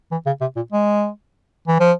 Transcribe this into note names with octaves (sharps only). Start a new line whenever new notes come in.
E3
C#3
C3
A#2
G#3
E3
F3